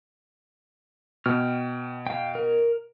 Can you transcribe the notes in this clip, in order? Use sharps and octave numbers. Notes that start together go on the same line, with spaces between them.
B2 G5 F6
F5 G5
A#4